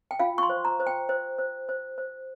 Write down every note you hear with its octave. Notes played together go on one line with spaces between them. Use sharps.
G5
F4 F5
C#6
C6
C5
A#5
C5
G5
C5
C5
C5
C5